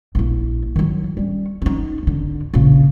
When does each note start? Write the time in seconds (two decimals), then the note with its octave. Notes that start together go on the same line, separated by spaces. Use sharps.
0.15 A#1 E4
0.76 D#3 F#3
1.17 G3 C#4
1.62 C#4 D#4
2.03 G#1 D3
2.54 A#1 C#3